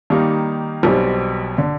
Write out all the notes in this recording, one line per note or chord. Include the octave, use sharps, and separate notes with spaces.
D#3 G3 A#3 D#4
B1 B2 G3 C4
D3